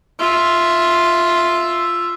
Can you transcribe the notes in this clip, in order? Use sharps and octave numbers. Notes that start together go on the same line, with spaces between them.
F4 E5